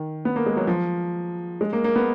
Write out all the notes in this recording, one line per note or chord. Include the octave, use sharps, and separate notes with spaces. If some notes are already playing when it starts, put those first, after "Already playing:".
Already playing: D#3
B3
A#3
G#3
F#3
F3
G#3
A#3
A#3
B3